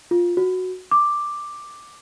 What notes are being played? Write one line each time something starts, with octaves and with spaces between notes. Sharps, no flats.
F4
F#4
D6